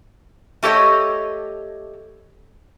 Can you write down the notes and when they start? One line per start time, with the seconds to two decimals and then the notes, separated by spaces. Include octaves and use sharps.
0.63 A3 G4 A4 C#5 D#5